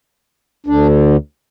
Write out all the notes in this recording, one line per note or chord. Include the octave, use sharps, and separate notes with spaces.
D2 D3 D4